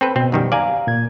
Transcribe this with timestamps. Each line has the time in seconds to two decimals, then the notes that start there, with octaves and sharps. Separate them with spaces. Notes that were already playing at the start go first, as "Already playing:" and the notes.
0.01 C4 A4 B4
0.16 B2 C4
0.32 F#2 D#3 G3
0.52 D5 F5 G#5 A#5
0.87 A#2 G#6